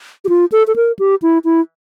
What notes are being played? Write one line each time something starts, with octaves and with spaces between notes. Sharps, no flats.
G4
F4
A4
A4
A#4
G4
E4
E4